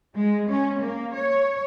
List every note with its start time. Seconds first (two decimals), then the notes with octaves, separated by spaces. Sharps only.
0.16 G#3
0.50 C#4
0.81 A#3
1.15 C#5